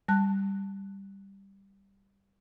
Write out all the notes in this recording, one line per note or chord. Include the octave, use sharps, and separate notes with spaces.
G3 A5 F#6